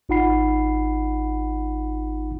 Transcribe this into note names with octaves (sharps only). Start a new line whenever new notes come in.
G#1 D#4 F4 F#5 B5 C7